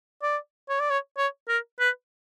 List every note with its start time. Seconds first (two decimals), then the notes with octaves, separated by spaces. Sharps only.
0.22 D5
0.69 C#5
0.80 D5
0.90 C#5
1.17 C#5
1.48 A#4
1.80 B4